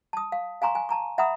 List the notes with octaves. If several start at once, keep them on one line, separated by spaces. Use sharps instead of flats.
A5 D#6
F5
F5 G#5 A#5 C6 C#6
G#5
A5 A#5 C#6
E5 F#5 A#5 B5 D#6